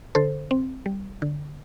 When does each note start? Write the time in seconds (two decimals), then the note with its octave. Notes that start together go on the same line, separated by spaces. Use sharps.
0.15 D3 A4 C5
0.51 C4
0.86 G3
1.22 D3